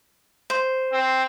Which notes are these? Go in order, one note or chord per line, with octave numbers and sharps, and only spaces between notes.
C5
C4